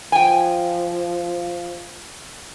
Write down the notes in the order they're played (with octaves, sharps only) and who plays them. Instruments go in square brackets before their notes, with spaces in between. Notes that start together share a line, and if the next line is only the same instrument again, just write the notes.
[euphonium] F3 [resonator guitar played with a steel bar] G5 G#5